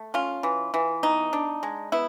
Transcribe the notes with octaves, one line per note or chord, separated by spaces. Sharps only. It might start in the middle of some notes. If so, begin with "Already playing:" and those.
Already playing: A3
C#4 F4
E3
E3
B2 D#4
D4
G#3
B3 E4